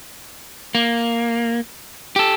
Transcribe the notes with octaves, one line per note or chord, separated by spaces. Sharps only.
A#3
G4 A4